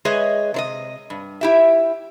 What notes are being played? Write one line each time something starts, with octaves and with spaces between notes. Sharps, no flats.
G#3 G#4 B4 C#5 D#5 E5
C3 C5 D#5
G2
E4 G4 E5